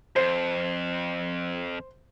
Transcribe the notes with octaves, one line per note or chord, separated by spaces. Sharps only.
F2 C5